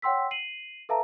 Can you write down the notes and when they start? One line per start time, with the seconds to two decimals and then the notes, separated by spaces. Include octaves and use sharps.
0.02 C#5 F#5 G5 C6 E6 B6
0.31 C7 D#7 F#7
0.89 A4 B4 E5 F5 A5 A#5